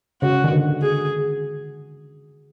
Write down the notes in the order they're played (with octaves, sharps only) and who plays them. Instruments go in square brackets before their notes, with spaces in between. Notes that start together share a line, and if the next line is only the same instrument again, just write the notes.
[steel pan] C#3 [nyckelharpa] F#4
[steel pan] D#3
D3
[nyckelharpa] G#4